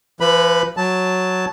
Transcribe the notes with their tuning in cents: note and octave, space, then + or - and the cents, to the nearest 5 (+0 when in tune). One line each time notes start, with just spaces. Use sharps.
F3 -40 B4 +0 B5 +0
F#3 +0 A5 +0